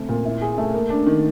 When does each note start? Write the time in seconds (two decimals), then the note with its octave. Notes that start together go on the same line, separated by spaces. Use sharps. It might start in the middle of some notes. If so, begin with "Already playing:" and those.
Already playing: C#3 A3 C4
0.09 A#2
0.25 E4
0.42 G#4
0.58 A3
0.74 A#3
0.90 D4
1.07 D#3